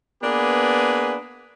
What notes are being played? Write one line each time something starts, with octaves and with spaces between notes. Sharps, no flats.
A#3 B3 D4 G#4 B4